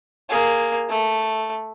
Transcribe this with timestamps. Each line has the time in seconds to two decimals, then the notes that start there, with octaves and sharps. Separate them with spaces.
0.30 A#3 G#4
0.89 A3